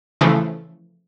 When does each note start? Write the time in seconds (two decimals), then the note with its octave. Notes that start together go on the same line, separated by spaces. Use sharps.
0.21 C#3 E3 F3 A3